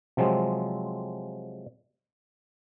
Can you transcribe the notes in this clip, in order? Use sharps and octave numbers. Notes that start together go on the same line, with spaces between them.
C3 F3 F#3 G#3 C4